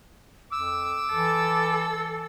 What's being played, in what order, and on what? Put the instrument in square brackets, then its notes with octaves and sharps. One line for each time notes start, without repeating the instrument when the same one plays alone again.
[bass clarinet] F2 [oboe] D6 [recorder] E6
[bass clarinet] E3 [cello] A4